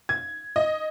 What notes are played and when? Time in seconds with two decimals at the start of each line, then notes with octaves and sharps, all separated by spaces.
0.09 G#6
0.56 D#5